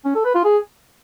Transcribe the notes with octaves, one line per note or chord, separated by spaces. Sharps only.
C#4
A4
B4
F4
G#4